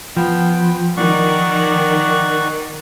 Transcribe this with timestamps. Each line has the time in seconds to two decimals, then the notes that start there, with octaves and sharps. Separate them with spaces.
0.17 F3 B3 G5
0.97 D#3 D5 F#5 C#6